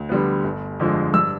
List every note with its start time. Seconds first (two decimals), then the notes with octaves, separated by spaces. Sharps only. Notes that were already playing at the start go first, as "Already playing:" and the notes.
Already playing: D2
0.09 D3 G3 B3
0.44 G1
0.79 F2 D3 F3 G#3
1.14 G2 E6